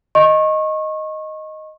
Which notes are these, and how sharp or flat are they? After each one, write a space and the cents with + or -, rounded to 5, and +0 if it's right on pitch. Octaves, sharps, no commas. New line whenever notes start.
D#5 +0 C#6 -30